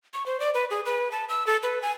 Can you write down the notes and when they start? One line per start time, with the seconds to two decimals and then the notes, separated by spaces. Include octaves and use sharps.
0.14 C#6
0.26 C5
0.40 D5
0.54 B4
0.70 G#4
0.86 B4
1.12 A5
1.29 E6
1.47 A4
1.63 B4
1.82 G#5